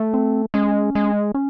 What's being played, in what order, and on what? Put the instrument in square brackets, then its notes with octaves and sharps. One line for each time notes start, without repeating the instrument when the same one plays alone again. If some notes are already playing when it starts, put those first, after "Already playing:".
Already playing: [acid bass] A3
[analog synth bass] C4
[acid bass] G#3 [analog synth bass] C#4
[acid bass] G#3
[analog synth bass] C#4